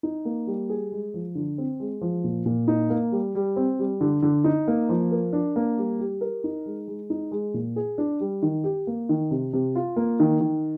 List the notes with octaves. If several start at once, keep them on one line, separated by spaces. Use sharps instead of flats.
D#4
A#3
G3
G#4
G#3
F3
D3
C4
G#3
F3
A#2
A#2
D#4
A#3
G3
G3
C4
G3
D3
D3
D#4
A#3
F3
A#4
D4
A#3
G3
G4
A#4
D#4
G#3
G#3
D#4
G#3
A#2
G#4
D4
G3
D#3
G4
A#3
D#3
C3
C3
F4
A#3
D#3
D#3